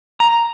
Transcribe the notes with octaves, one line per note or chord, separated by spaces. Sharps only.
A#5